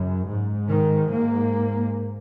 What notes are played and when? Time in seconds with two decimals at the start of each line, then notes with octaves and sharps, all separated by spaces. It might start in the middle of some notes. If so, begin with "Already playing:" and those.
Already playing: F#2 C#3
0.27 G#2
0.69 D#3
1.10 A#3